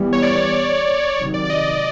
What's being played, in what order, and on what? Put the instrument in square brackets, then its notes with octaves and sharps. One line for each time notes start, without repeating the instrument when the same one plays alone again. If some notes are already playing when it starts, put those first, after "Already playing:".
Already playing: [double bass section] E3 G3 B3
[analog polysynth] C#5
D5
C#5
D5
[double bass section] C3 D#3 F#3 [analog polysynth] C#5
[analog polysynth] D5
D5
D#5
D#5